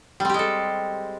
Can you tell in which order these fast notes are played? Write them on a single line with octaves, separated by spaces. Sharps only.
G3 C4 G4 G#3 A4